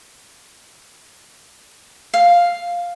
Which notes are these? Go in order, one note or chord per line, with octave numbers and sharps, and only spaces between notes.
F5